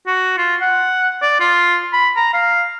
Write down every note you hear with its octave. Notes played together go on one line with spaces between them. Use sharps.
F#4
F4
F#5
D5
F4
B5
A#5
F5